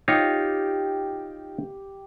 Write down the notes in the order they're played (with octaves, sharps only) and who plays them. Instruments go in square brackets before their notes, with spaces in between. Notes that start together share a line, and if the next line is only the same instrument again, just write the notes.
[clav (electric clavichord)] D#4 F4 C#5 [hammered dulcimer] G4